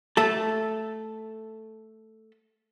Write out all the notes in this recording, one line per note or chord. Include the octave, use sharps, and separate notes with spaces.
A3 A4